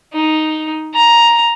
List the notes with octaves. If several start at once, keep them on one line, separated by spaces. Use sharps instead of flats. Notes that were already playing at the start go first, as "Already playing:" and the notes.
D#4
A#5